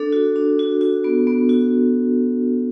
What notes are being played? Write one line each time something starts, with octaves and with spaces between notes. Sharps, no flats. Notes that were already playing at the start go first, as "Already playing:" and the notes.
Already playing: D4 A4
F#4
D4
F#4
F#4
B3
B3
F#4